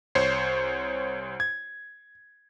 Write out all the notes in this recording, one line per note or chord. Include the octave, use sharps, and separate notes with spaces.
C2 C5 C#5 C7
G#6